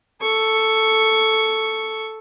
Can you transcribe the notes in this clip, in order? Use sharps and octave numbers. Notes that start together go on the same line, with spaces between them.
A4 C#6